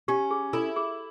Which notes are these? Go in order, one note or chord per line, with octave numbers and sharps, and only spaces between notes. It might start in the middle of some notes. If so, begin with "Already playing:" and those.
C#4 G4
G#4
E4 A4
G#4